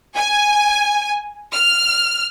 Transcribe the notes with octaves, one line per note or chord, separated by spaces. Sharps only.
G#5
F6